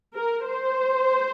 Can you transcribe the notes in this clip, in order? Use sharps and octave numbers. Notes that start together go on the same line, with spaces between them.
A#4
C5